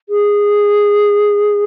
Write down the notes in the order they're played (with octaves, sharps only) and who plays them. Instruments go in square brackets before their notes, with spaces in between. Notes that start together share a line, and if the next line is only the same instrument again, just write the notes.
[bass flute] G#4